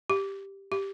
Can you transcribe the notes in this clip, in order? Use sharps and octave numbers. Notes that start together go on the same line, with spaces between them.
G4
G4